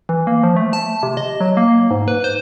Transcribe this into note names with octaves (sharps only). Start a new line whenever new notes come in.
E3
A#3
F3
A3
A5
C3
D#5
F#3
A#3
G#2
B4
C5